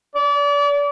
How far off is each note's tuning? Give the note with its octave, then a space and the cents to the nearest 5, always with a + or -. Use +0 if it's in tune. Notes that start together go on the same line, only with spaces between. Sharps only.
D5 -35